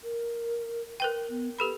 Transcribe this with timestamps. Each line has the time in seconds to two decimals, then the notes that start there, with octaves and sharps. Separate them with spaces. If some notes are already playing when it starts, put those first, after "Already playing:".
0.03 A#4
1.00 A#4 B4 G5
1.30 B3
1.59 G4 A4 B4 B5